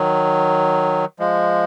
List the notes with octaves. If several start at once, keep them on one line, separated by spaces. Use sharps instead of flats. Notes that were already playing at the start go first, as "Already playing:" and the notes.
Already playing: D#3 F#3
F3 G#3